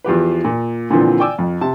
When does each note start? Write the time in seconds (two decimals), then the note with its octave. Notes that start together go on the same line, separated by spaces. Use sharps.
0.04 E2 F3 G4 B4
0.45 A#2
0.90 A#2 D3 E3 F3 C4
1.19 D5 G5 G#5 D6 E6
1.38 F2
1.61 C3 A5